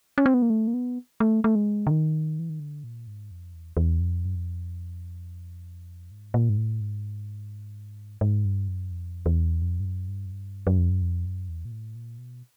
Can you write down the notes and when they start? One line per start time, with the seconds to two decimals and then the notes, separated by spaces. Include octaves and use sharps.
0.18 C#4
0.26 C4
0.34 B3
0.42 A#3
0.50 A3
0.68 A#3
0.74 B3
1.20 A3
1.44 A3
1.55 G#3
1.87 D3
1.91 D#3
2.39 E3
2.50 D#3
2.60 D3
2.84 A#2
3.07 G#2
3.31 F2
3.54 E2
3.77 E2
4.00 F2
4.25 F#2
4.36 F2
6.11 G#2
6.34 A#2
6.49 G#2
6.57 A2
6.81 G#2
8.21 G#2
8.45 G2
8.68 F#2
8.91 F2
9.26 E2
9.62 F2
9.80 G2
9.85 F#2
10.08 G2
10.26 F#2
10.32 G2
10.67 F#2
10.78 F2
10.90 F#2
11.02 F2
11.26 F#2
11.49 E2
11.65 A#2
11.72 A2
11.95 A#2
12.18 B2